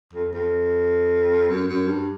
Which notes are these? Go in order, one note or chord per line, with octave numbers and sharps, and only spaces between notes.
F2
F2
F#2
F#2
G2